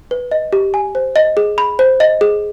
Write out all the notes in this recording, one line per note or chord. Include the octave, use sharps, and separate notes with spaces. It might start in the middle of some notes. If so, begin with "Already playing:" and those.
B4
D#5
G4
G#5
C5
D#5
G#4
B5
C5
D#5
G#4